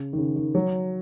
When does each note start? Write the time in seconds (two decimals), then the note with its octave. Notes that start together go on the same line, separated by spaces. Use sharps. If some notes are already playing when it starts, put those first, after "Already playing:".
Already playing: C#3
0.13 D#3
0.18 C#3
0.36 D#3
0.55 F#3